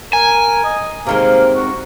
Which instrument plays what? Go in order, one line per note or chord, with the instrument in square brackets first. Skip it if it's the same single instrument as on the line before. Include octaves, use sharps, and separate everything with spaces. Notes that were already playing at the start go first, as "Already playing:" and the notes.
[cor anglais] A#4 [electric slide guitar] G#5
[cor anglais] D#5
[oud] C3 D#3 G#3 [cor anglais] A#3
[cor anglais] F#4